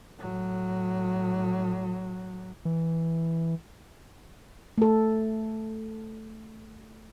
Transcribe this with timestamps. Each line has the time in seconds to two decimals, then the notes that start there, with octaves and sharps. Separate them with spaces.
0.19 A2 F#3
2.65 E3
4.78 A3 A4